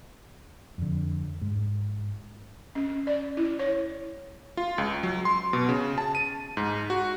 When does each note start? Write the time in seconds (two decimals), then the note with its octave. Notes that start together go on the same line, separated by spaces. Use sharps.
0.78 F2 D3
1.42 G#2
2.75 C#4
3.07 D5
3.37 E4
3.59 C#5
4.57 F4
4.78 C#2
5.03 F#3
5.25 C6
5.53 B2
5.69 C#3
5.98 A5
6.15 D#7
6.57 G#2
6.90 F#4